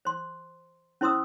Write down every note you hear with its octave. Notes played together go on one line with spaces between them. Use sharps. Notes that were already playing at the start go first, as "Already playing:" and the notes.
C5 C6
C#4 E4 C5 C6 D#6 E6